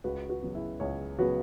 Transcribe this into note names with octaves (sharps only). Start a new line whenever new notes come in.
C#2 F#4 B4
F#4 B4
C#3 F#3 B3
E4 G#4
C#2 G#4 C#5
C#3 F#3 B3 F#4 B4